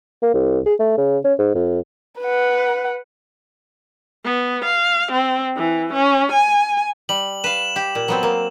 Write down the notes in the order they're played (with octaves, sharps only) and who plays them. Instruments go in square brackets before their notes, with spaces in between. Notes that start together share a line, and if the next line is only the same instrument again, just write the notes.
[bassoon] A#3
C2
G#4
A3
C#3
C#4
G#2
F2
[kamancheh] B4 F#5
[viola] B3
F5
C4
E3
C#4
G#5
[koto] G3 [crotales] F#7
[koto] B4 F5 [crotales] E7
[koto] G4
A#2
F#3 B3 C4
A#3